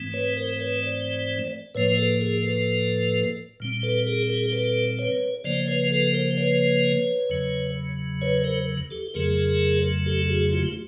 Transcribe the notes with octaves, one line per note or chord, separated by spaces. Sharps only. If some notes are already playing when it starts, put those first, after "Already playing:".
Already playing: G#2 E3 A3 C4
B4 C#5
A#4 C5
B4 C#5
C5 D5
A2 F3 A#3 B4 C#5
A4 B4
G#4 A#4
A4 B4
A#2 G3 C4
A4 B4
G#4 A#4
G#4 A#4
A4 B4
B4 C#5
C#3 F3 A#3 C5 D5
B4 C#5
A4 B4
A#4 C5
B4 C#5
E2 C#3 F#3
B4 C#5
A#4 C5
G4 A4
F2 C#3 F#3 A3 G#4 A#4
G4 A4
F#4 G#4
F4 G4